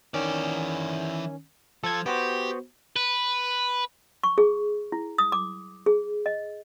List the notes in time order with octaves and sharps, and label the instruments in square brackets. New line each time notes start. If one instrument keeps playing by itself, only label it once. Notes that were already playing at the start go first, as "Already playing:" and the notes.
[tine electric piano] D#3 C#4 [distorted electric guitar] E3 D5
[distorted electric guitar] F3 [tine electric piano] A4 G#6
[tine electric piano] B3 F#4 C5 [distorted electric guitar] G4
[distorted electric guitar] B4
[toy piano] C#6
G#4
E4
D#6
D6
G#4
D#5